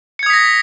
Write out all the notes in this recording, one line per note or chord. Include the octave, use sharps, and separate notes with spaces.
D#6 G#6 A#6 B6 C#7